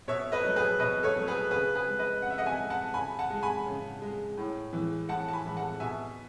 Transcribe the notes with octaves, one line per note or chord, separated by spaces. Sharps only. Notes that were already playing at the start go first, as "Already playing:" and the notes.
B2 C#5 E5
B4 D#5
F#3 A3
G#4 B4
B2 B4 D#5
A4 C#5
F#3 A3
G#4 B4
C#3 G#4 B4
G#4 B4
G#3
B4 D#5
C#3 F#5
E5
D#5 F#5
E5 G#5
G#3
F#5 A5
C#3 G#5 B5
F#5 A5
G#3
G#5 B5
C#3
G#3
A2
E3 G#3
A2 F#5 A5
A5
G#5 B5
E3 G#3
F#5 A5
B2 E5 G#5